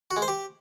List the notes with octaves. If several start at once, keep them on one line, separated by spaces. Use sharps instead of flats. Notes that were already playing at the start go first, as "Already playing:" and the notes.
F#4
G#3
C5
G4